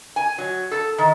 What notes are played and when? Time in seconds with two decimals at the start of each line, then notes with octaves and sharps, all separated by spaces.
0.16 G#5
0.38 F#3
0.71 A4
0.98 D#3